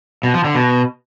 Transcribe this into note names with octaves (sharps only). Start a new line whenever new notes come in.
B2
F3
D3
B2